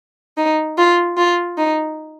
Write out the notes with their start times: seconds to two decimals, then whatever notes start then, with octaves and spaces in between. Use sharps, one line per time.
0.37 D#4
0.78 F4
1.17 F4
1.58 D#4